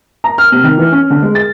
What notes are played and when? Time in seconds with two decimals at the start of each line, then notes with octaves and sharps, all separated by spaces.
0.24 A#5
0.38 F6
0.52 C3
0.64 D#3
0.78 E3
0.92 C#4
1.10 D3
1.22 G#3
1.35 A6